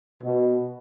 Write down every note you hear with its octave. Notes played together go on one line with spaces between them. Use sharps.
B2